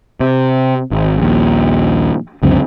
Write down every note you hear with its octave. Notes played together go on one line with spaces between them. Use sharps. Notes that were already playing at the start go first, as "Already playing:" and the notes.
C3
G#1
A#1 D#2
C#2 F#2 D3 C4